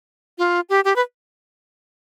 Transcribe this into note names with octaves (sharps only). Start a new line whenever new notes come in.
F4
G4
G4
B4